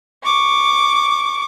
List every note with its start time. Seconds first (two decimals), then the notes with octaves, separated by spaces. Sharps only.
0.25 C#6 D6